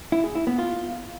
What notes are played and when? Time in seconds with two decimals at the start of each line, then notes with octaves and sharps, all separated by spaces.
0.12 E4
0.24 G#4
0.35 E4
0.47 B3
0.59 F4